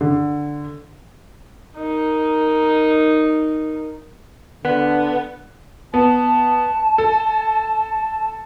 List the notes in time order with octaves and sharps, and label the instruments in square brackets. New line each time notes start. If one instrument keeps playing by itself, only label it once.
[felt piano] D3
[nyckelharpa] D#4 A#4
[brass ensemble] D3 [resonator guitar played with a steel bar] B3
[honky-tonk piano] B3 [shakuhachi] A5
[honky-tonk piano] A4